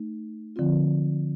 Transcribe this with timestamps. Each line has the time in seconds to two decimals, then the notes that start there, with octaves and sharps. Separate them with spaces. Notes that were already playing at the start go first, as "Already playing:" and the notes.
Already playing: A3 D#4
0.56 D3 F3 C4 F4